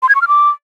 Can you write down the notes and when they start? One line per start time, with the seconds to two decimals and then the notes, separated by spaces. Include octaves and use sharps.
0.03 C6
0.09 G#6
0.15 C#6
0.22 F6
0.28 D6